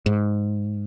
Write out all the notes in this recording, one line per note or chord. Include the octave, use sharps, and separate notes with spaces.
G#2